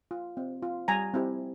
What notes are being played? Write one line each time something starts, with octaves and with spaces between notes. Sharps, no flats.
F4
C4
F4
G3 G#5 A#5
C4 E4 G4